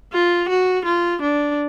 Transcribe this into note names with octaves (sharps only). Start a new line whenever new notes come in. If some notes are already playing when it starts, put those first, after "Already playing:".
F4
F#4
F4
D4